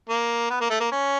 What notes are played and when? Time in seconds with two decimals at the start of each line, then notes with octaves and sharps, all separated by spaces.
0.09 A#3
0.50 B3
0.61 A#3
0.70 A3
0.80 A#3
0.92 C#4